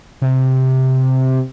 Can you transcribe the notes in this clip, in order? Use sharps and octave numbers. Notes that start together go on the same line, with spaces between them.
C3